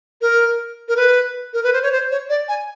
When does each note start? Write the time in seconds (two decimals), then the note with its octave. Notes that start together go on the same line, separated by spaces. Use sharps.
0.21 A#4
0.88 A#4
0.97 B4
1.53 A#4
1.64 B4
1.73 C5
1.83 C#5
1.92 C5
2.11 C#5
2.29 D5
2.48 G#5